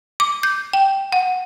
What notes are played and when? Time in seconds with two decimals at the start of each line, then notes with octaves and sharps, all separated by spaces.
0.20 D6
0.43 G6
0.73 G5
1.12 F#5